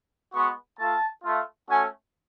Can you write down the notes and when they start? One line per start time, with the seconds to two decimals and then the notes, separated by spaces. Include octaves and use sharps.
0.33 G#3 B3 F#4 C#6
0.78 A3 F4 A5
1.24 A3 F4
1.69 A3 C#4 F#4 G#5